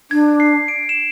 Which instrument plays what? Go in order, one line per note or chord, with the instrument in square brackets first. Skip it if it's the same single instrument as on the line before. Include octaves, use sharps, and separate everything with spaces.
[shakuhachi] D4 [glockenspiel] G#6
[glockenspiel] C7
D7
E7